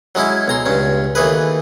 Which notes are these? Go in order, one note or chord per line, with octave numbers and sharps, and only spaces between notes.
F#3 G#3 C#4 E4
B1 A#5 C6
C#2 G2 C#4
D#2 E3 A3 G#4 B4